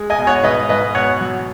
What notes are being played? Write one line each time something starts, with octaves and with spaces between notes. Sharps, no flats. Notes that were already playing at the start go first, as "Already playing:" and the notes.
Already playing: G#3
D#5 G#5
B2
C#5 F#5
G#2 B4 D#5
G#2 B4 D#5
B2 C#5 F#5
F#3